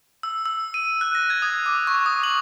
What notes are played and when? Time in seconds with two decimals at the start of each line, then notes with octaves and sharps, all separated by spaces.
0.23 E6
0.46 E6
0.74 D#7
1.01 F#6
1.15 A#6
1.30 G#6
1.42 D#6
1.66 D6
1.87 C#6
2.06 D#6
2.23 F#7